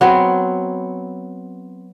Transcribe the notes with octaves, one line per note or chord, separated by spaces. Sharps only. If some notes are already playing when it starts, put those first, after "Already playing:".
F#3 B3 C4